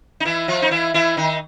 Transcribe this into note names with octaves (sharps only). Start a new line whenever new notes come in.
D#4
E3 E4
F3 F4
D#4
E3 E4
E3 E4
D#3 D#4